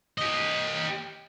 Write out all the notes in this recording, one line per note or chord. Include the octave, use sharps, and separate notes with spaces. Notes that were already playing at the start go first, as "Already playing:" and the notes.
G4 D#5